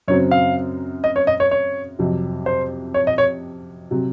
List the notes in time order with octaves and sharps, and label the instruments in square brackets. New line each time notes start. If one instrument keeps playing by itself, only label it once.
[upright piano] F#2 C#3 F#3 C4 [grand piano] C#5
[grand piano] F5
D#5
C#5
D#5
C#5
C#5
[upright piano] F2 C3 F#3
[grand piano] C5
C#5
D#5
C#5
[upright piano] C3 F#3